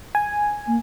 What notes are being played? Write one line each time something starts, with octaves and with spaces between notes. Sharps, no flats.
G#5
A#3